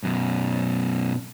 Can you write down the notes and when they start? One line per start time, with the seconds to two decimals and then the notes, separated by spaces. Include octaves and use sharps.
0.03 F#2 B2